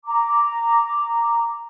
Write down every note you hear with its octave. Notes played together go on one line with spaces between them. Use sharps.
A#5 D6